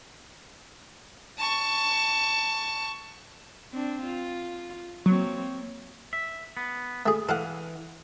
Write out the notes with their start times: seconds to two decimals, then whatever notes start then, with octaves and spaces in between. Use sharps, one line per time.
1.38 A5 C#6
3.73 C4 D4
4.03 F4
5.06 F#3 A#3 C4 C#5
6.13 E5
6.57 B3
7.06 A3 G#4
7.29 E3 A4 F5 F#5